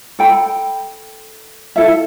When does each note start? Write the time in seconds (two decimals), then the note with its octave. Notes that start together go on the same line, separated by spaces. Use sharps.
0.19 A4 G5 B5
1.76 E4 A4 E5